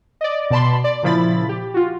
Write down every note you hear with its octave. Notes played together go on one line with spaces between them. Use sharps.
D5 D#5
B2 D5 A5 B5 C6
D5
A#2 C#3 F3 E4 B5 A6
G4
F4 F#4